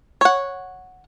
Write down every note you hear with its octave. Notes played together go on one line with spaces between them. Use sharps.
C#5 F#5